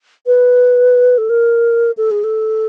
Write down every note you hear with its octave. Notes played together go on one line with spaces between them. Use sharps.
B4
A4
A#4
A4
G#4
A4